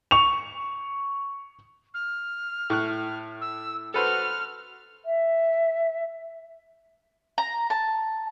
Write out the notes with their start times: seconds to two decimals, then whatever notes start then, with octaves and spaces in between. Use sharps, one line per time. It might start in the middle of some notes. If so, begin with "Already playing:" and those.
0.11 C#6 F7
1.94 F6
2.70 A2 C#6 F#6
3.41 E6
3.94 F#4 A4 B4 C5 F6
5.06 E5
7.38 A#5
7.70 A5